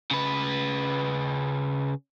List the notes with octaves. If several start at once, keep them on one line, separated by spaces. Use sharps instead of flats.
C#3 B4